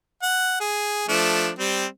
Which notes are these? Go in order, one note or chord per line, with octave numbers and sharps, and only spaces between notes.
F#5
G#4
F3 A3 D4
G3 C4